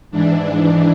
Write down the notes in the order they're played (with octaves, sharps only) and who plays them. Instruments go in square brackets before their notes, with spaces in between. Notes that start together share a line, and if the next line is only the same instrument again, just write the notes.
[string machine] G#2 E3 D4